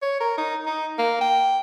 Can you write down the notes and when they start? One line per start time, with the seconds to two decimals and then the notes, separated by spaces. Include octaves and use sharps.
0.02 C#5
0.20 A#4
0.38 D#4
0.66 D#4
0.99 A#3
1.21 G5